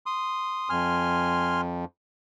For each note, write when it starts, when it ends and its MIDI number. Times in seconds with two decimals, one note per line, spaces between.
0.06 0.69 84
0.06 0.69 87
0.70 1.85 41
0.70 1.61 80
0.70 1.61 84
0.70 1.61 89